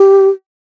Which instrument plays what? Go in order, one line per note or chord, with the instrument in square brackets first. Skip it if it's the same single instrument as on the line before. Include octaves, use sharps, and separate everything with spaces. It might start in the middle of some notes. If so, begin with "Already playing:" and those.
Already playing: [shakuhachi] G4